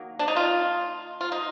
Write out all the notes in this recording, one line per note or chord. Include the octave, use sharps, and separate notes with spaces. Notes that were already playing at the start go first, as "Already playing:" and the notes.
Already playing: D#3 F#3 A#3
D4
D#4
F4
F4
D#4